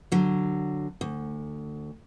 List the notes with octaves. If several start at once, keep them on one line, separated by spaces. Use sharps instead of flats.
D3 F#3
D2